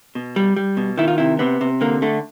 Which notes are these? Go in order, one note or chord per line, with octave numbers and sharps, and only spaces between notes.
B2
G3
G3
B2
D#3 E4
F4
C3 E4
C3 B3
C3
D3 A#3
D3 A3